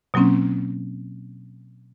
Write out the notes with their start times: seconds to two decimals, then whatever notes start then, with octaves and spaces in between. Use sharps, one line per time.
0.14 B2 F#3 A#3 C4 C#4